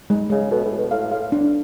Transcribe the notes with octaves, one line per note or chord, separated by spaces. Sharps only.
G#3
C#3 G#3
B2 A4
A2
A4
B2
A2 F5
A2 F5
D4